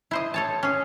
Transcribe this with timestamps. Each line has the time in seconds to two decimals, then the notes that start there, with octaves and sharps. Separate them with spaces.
0.11 E4 C5 D#5
0.34 A4 C#5 A5
0.63 C#4 G#4